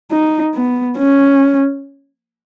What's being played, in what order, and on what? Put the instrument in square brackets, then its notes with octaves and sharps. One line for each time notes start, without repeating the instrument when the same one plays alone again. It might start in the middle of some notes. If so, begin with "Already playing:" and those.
[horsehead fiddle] D#4
B3
C#4